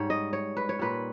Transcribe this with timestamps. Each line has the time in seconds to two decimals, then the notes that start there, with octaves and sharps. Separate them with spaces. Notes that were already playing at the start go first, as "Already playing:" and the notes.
Already playing: G#2 G3 C#5
0.10 D#5
0.33 C#5
0.57 B4
0.69 C#5
0.79 A#2 G3 B4